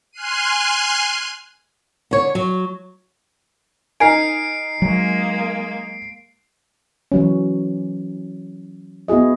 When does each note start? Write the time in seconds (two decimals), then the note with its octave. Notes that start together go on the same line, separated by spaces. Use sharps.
0.12 G#5 C6 F6 F#6 C7 D#7
2.11 D3 C#5
2.35 F#3
4.00 D#4 A#4 G#5 C7 D7
4.82 F#3 G#3 A#3
7.12 E3 F#3 C#4
9.08 B3 E4 F#4 G#4 D#5